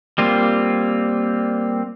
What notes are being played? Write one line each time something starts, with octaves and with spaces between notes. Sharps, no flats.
G3 A#3 C4 F4